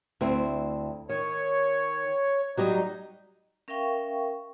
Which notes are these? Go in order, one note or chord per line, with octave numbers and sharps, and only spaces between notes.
D2 C4 E4
D#3 C#5
F#3 G3 D#4 D#5
C#4 A#4 E5 F5 G5 C#6